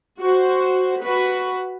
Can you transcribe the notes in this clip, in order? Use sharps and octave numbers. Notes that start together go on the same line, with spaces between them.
F#4 C5
F#4 B4